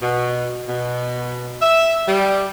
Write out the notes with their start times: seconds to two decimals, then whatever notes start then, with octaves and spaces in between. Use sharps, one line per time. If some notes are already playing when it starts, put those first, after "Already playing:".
0.01 B2
0.68 B2
1.62 E5
2.08 G3